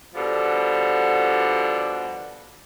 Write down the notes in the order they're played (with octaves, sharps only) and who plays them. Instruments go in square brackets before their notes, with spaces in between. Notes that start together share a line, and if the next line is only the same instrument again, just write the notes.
[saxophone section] B2 D3 F3 G3